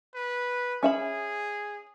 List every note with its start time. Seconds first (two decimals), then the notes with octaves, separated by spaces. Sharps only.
0.15 B4
0.83 C#4 G#4 E5 B5